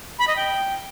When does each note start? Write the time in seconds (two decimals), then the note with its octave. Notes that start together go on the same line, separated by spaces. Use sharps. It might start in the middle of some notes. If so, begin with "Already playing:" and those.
0.19 B5
0.28 D#5
0.36 G5